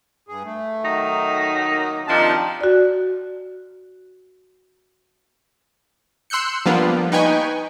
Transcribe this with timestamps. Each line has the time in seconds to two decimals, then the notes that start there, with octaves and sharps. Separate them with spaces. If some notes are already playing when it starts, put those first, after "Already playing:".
0.28 G2 G#4
0.44 A3
0.83 D#3 F#3 D#4
1.68 A#3
2.07 C3 D#3 F3 D4 D#4 A5
2.61 F#4 D5
6.30 C6 E6 F#6 G6 C#7
6.66 F3 G3 A#3 B3 D4 F4
7.12 D#4 B4 G5 G#5 C#6